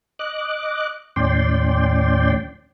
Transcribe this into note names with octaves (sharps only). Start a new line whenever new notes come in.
D#5 D6 F#6
D#2 A2 C#4 D5 G5 C6